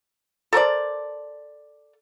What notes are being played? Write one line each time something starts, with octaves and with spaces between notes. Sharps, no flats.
A4 A#4 C5 D5